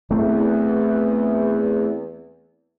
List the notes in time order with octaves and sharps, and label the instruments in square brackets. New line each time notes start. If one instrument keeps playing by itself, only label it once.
[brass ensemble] E2 [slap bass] A3 C4